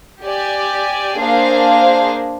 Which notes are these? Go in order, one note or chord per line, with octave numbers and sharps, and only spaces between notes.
G4 D5 G#5
A#3 D4 G#4 C5 F5